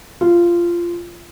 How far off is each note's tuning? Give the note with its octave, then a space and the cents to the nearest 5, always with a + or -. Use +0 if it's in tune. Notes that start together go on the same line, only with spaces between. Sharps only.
F4 -15